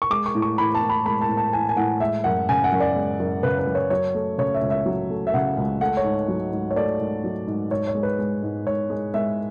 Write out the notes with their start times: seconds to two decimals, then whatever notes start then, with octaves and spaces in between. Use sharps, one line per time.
0.02 C#6
0.10 G#3 D6
0.26 C#6
0.35 A2
0.42 C#6
0.58 E3 B5
0.75 A5
0.82 A2
0.89 B5
1.06 G#3 B5
1.21 A5
1.29 A2
1.37 A5
1.53 E3 G#5
1.69 G#5
1.77 A2 F#5
2.00 G#3 E5
2.24 F#2 F#5
2.49 C#3 G#5
2.64 F#5
2.72 F#2
2.80 D5
2.96 G#3
3.20 F#2
3.43 C#3 B4
3.59 B4
3.67 F#2
3.75 C#5
3.90 F#3 C#5
4.14 A3
4.38 C#3 C#5
4.54 E5
4.62 C#2
4.70 E5
4.86 F#3
5.10 A3
5.27 E5
5.34 C#3 F#5
5.57 C#2
5.80 A3 F#5
5.97 C#5
6.04 G#2
6.28 F#3
6.52 G#2
6.71 C#5
6.76 A3 D5
7.00 G#2
7.24 F#3
7.47 G#2
7.71 G#2 C#5
7.87 C#5
7.95 G#3
8.03 B4
8.19 G#3
8.43 G#2
8.66 G#2 C#5
8.90 G#3
9.14 G#3 E5